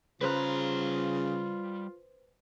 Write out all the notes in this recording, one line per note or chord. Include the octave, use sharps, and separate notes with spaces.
C#3 G3 F4 B4 C5 A#5 F#6